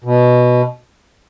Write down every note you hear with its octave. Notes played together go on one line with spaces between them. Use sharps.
B2